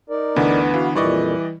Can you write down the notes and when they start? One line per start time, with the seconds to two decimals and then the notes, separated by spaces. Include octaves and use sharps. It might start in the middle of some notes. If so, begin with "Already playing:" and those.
0.10 D#4 A#4 D5
0.36 D2 D3 E3 B3
0.74 E3 F#4 F5
0.95 F2 A#2 D#3 E3 G3 D5 D#5 C#6